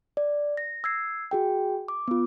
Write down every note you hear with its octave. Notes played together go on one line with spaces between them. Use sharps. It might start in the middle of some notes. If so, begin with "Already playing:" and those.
D5
A#6
E6 G#6 C7
F#4 G#4 G5
D6
B3 F4